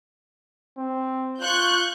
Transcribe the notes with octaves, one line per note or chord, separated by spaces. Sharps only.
C4
F4 C#6 F#6 G6